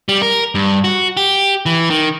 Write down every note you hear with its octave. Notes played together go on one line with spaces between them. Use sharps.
G3
A#4
G2
F#4
G4
E3
D#3